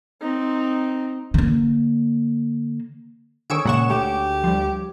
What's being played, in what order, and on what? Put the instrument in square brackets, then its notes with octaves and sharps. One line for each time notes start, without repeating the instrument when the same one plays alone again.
[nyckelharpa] C4 D#4
[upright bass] D3 A#3
[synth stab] D3 D#3 [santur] G#4 C#5 [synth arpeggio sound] C#6 E6 D7
[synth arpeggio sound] A#2 C#3 C#6 [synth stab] G#3 F#5 E7
[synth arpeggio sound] D2 [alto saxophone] G4 [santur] D6
[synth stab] F3 G3